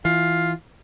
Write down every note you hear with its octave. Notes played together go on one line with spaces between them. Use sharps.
E3 F4